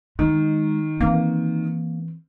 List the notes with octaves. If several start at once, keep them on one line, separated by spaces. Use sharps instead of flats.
D#3 G#3
E3 A#3 C4